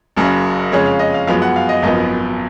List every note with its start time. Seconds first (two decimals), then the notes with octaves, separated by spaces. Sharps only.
0.16 F#1 F#2 C#3
0.72 F2 C#3 G#3 C#4 C#5
0.86 F5
0.99 D#5
1.14 F5
1.27 F#2 F3 G#3 B3 F5
1.42 F#5
1.56 F5
1.69 D#5
1.82 G#1 F#2 F3 B3 D#5